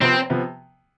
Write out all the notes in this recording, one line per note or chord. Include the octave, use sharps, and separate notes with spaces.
C3 F3 B3 C4
C3 F3 B3